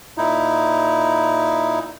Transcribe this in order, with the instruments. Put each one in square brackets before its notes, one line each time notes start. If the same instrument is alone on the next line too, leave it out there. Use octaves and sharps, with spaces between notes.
[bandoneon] A#2 D#4 E4